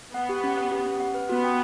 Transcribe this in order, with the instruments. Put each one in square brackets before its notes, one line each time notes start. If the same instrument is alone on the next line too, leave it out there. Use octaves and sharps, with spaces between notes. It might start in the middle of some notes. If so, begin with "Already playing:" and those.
[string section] B3 [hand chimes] F#5
[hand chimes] G4
C#4
F#5
G4
C#4
F#5
B4
[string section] B3 [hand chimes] F#4
[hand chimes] G5